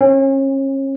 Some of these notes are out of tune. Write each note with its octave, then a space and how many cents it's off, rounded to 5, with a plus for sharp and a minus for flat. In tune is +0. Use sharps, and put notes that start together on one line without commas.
C#4 -35